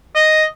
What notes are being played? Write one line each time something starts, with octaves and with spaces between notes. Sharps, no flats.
D#5